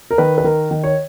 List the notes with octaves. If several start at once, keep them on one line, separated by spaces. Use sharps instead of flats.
A#4
D#3 B4
B4
D#3 A#4
D#3
C#5